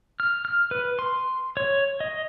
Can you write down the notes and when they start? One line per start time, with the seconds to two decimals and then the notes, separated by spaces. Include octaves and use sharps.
0.20 F6
0.45 F6
0.71 B4
0.99 C6
1.57 C#5
2.00 D#5